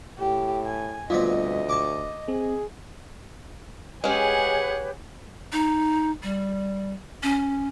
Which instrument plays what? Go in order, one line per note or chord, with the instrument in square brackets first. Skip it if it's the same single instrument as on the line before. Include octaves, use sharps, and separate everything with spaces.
[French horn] A2 [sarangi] G4
[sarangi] G#5
[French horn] D2 [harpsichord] G2 B2 C4 [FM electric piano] F4 [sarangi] D#5
[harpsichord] A5 C#6 D6
[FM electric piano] C4 [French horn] G#4
[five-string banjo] G#3 C#4 [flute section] G4 B4 C#5 [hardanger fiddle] G#4 F#5
[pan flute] D#4
G3
C#4